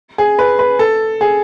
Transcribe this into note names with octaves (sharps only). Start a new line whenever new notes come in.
G#4
B4
B4
A4
G#4